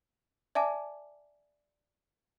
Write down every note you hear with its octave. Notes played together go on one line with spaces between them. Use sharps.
D5 E5 G#5 A5 D6